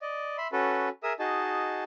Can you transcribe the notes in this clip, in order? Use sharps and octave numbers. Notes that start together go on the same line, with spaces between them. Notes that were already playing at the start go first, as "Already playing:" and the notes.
D5 D#5
E5 B5 C6
C#4 F#4 A4 B4
G#4 A#4 E5 D#6 E6
D#4 F#4 G#4 D#5 A5